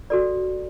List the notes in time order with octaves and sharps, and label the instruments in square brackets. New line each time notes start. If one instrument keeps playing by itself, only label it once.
[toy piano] F#4 A4 D5